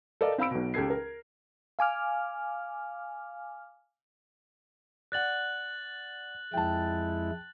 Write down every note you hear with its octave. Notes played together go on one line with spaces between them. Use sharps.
A4 A#4 D5 D#5 F5
C4 F5 B5 E6 D7
B1 B2
C#2 G4 A4 G#6 C7
A#4
F5 G#5 D6 F6
D5 F#5 F#6 A6 F#7
F2 G#3 E4 G5 A5